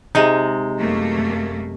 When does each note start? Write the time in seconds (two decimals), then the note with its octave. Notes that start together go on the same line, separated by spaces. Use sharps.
0.15 C3 G#3 D#4
0.78 F#2 A3 A#3